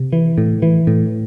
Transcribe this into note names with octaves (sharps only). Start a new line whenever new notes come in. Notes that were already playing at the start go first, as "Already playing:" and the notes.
Already playing: C3
E3
A2
E3
A2